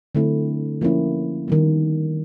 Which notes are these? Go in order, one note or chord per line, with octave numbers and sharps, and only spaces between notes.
D3 F#3 A3 C4 E4
F3 A#3 C#4 E4
D#3 G3 B3